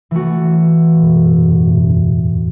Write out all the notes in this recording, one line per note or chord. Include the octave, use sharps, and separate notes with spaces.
E3 A3 F#4
A2
F#2 B2
F#2 B2
E2 A2
F#2 B2
F#2
E2 A2